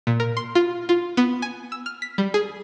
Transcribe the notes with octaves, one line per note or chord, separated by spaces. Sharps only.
A#2
A#4
C6
F4
F4
B3
G#5
E6
F6
B6
G3
G#4